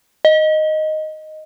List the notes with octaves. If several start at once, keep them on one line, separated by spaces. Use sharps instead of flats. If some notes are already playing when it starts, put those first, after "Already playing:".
D#5